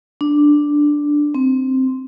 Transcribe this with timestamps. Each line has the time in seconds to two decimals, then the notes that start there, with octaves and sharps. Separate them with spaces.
0.21 D4
1.35 C4